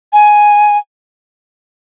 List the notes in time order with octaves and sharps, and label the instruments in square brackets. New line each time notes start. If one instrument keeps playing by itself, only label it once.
[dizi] G#5